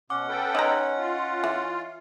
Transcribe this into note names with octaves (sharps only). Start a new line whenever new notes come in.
B2 C#4 F#5 D6
A4 B4 G5
D#4 C#5 D#5 A#5 C6
F4
E3